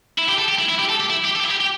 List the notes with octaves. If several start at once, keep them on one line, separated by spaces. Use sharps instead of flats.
E4
G4
A4
G4
E4
E4
G4
A4
G4
E4
G4
A4
G4
E4
G4
G4